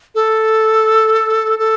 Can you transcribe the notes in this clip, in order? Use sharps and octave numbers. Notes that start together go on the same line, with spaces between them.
A4
A4